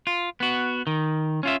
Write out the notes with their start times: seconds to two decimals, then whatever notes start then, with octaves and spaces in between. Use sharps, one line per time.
0.07 F4
0.40 B3 F#4
0.87 D#3
1.43 C#4 F4 E5